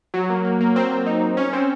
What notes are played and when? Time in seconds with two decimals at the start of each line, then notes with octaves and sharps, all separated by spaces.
0.14 F#3
0.30 A#3
0.45 A#3
0.60 A#3
0.76 C4
1.06 D#4
1.37 C#4
1.53 C4